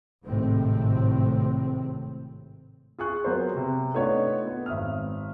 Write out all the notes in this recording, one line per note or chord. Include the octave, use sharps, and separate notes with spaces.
G#1 A2 C3 C4
F4 G#4 C#6 F#6
F#3 B3 F#4 A#4 C5
C3
A3 B3 D4 D#4 F4 C#5
B3
G#1 E5 D#6 F6